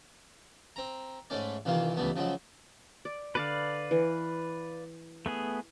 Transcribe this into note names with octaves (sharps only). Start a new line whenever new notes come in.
C4 A#5
G#2 G#3 A3 C#4 D5
C2 D#3 E3 A#3 F4 F5
C#2 E3 G3 A3 B3
C#3 F3 F#3 G#3
D5
D3 B4 D5 F5 A5 D6
E3
A3 B3 G#4